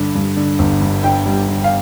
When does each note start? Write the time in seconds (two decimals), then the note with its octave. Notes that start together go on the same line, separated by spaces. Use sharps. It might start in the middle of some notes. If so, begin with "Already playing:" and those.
Already playing: G2 D3
0.15 G2
0.37 D3
0.59 G1
0.81 G2
1.03 D3 G5
1.26 G3
1.48 D3
1.64 F5